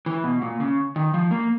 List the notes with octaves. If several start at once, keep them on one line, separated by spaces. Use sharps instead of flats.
E3
B2
A#2
C#3
D#3
F3
A#3